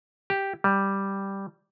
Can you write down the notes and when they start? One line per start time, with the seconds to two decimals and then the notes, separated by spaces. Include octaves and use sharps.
0.30 G4
0.64 G3